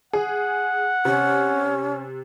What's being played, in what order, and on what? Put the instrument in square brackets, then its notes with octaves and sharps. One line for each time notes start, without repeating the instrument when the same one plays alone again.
[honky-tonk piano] G#4 [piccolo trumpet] F#5
[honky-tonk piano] C3 [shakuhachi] C#4